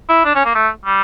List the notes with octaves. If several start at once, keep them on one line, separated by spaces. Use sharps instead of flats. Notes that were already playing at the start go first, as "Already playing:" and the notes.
E4
D4
C#4
A#3
A3
G3